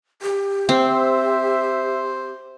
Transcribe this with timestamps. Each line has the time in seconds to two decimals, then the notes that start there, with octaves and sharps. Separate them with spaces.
0.22 G4
0.69 C4 C5 E5